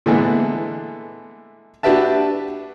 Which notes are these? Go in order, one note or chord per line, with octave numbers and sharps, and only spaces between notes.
A#2 D3 E3 G#3 A3 B3
D4 F#4 G4 B4 E5 A5